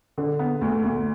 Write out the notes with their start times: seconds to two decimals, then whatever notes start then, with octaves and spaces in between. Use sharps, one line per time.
0.18 D3
0.39 B3
0.61 D2
0.83 D2